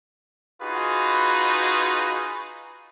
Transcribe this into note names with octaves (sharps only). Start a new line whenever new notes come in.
D#4 F4 F#4 G#4 B4